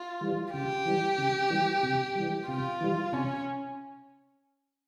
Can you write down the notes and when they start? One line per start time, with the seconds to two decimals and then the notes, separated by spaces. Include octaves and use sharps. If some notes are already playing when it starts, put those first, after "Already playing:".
Already playing: F4
0.21 E3 G3
0.53 C#3 G4
0.86 E3 G3
1.18 C#3
1.50 E3 G3
1.83 C3
2.15 E3 G3
2.47 C3 F4
2.80 E3 G3
3.13 C3 C#4